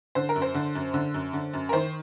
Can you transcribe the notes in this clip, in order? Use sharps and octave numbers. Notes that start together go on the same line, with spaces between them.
D3 C5
A#4
F#2
C5
D3
F#2
D3
F#2
D3
F#2
A#4
D#3 C5